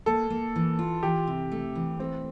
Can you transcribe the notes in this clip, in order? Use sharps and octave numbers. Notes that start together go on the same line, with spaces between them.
A#3 A4
A#3
E3
F4
E3 G4
C3
A3
E3
A3 C4